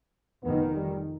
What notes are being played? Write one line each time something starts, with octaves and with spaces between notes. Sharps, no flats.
F1 D#3 B3
G3